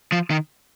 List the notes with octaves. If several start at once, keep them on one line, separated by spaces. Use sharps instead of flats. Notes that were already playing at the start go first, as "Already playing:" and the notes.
F3
D#3